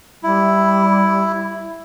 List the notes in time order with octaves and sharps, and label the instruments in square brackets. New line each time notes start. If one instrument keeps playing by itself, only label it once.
[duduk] G3 [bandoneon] E4